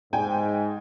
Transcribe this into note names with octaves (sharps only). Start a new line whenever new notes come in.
G#2 G5 G#5